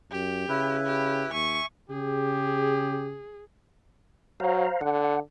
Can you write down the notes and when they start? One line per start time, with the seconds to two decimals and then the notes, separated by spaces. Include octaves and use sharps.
0.12 F#2 G4
0.49 C#3 E4 B4
0.86 G4
1.33 D#2 E5 G#5 C#6
1.90 C#3 G4 G#4
4.40 F#3 C5 F5 A#5
4.81 D3 F#5